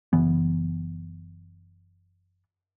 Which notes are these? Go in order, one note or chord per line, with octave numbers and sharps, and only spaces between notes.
F#1 E3 B3